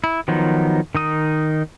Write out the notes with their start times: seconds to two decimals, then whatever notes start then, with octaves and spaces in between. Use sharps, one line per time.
0.04 E4
0.28 D#3 F3 F#3 B3 D#4
0.95 D#3 D#4 D#6